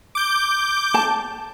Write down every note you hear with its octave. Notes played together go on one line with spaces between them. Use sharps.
D6 G6
A5